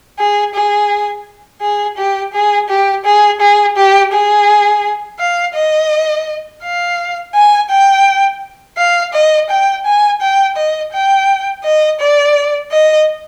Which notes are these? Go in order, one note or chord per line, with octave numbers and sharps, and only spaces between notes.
G#4
G#4
G#4
G4
G#4
G4
G#4
G#4
G4
G#4
F5
D#5
F5
G#5
G5
F5
D#5
G5
G#5
G5
D#5
G5
D#5
D5
D#5